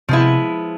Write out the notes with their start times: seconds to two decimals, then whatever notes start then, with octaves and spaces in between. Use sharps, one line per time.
0.09 C3 F3 G#3 B3 E4